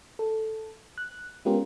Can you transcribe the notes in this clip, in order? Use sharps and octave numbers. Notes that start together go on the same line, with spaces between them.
A4
F#6
G#3 B3 C#4 F4 G4 A#4